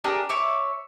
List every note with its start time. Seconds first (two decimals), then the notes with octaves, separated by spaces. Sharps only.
0.04 D4 G4 G#4 A#4
0.29 C#5 E5 D6